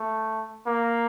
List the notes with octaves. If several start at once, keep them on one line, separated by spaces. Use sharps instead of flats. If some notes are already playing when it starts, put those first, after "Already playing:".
Already playing: A3
A#3